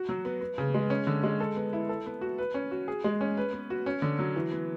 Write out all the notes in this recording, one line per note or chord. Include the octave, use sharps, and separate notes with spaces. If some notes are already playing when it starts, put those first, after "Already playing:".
Already playing: F#4
F#3
B3
B3
C#3
G#3
C#4
D3
G#3
A4
B3
E4
A4
B3
F#4
B4
C#4
F#4
G#4
G#3
C#4
B4
B3
F#4
C#4
D3
F#3
E3
B3